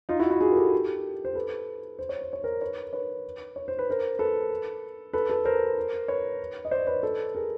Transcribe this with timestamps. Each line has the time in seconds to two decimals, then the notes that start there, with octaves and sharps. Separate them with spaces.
0.09 D#4 F4
0.20 E4 F#4
0.30 E4 F#4
0.41 F#4 G#4
0.52 A#4
0.56 G4 A4
1.25 C5
1.35 A4 B4
1.99 C5
2.09 C#5
2.21 C5
2.33 C#5
2.44 A#4 C5
2.61 B4 C#5
2.93 B4 C#5
3.56 C#5
3.68 C5
3.79 B4
3.90 A#4 C5
4.19 A4 B4
5.13 A4 B4
5.29 A4 B4
5.45 A#4 C5
6.08 B4 C#5
6.65 D#5
6.71 C5 D5
6.87 B4 C#5
7.03 A4 B4
7.35 G#4 A#4